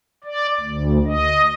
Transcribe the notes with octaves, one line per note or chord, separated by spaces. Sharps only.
D5
D2
D#5